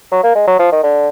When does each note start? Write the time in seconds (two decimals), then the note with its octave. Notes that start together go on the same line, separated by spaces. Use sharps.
0.12 F#3
0.23 A#3
0.35 G#3
0.47 F#3
0.59 F3
0.72 D#3
0.83 D3